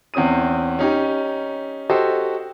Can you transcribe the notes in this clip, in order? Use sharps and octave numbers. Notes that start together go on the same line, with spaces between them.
E2 C4 C#4 D#6 D#7
C#4 D#4 G4
F#4 G4 A4 C5 D#5